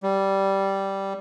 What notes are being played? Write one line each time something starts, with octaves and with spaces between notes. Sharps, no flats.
G3